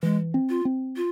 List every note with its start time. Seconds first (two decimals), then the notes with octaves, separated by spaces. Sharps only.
0.03 E3 G#3
0.34 C4
0.49 F4
0.65 C4
0.97 F4